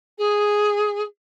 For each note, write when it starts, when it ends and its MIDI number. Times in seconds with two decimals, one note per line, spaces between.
0.18 1.02 68